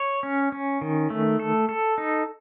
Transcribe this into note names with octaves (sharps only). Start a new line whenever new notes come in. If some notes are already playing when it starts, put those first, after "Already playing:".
Already playing: C#5
C#4
C#4
D#3
A3
A4
A4
D#4